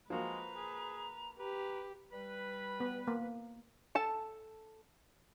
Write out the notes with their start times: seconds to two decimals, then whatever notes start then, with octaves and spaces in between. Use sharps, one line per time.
0.10 F3 G#3 A#3 F#4 B4 A#5
0.56 G#4
1.39 G4 B4 A#5
2.11 G3 B4
2.80 B3
3.07 A#3
3.95 A4 A5